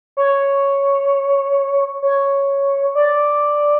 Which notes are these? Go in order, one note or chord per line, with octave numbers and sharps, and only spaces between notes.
C#5
C#5
D5